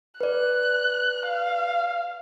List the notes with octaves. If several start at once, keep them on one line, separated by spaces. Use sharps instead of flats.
B4 D5 F#6
F5